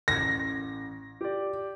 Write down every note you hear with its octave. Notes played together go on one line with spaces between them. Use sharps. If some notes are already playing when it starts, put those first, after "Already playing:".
A1 G#6 A#6
G4 D5